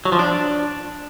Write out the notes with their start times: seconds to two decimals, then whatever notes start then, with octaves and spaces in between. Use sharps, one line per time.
0.05 F#3
0.12 F3
0.19 D4